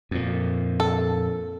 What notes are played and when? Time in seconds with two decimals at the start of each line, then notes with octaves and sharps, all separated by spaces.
0.11 F2 A#2
0.80 A4